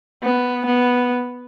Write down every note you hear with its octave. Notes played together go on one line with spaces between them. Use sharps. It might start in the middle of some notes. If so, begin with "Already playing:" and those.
B3
B3